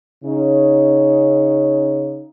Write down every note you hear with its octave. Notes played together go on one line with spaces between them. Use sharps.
C#3 C#4 D#4